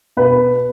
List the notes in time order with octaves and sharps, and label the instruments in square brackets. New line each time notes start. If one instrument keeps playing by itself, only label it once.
[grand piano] B2 B4